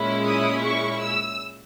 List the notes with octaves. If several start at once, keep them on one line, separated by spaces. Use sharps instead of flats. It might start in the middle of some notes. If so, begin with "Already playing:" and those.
Already playing: A#2 G#3 C#4 E4
D#6
C#6
E6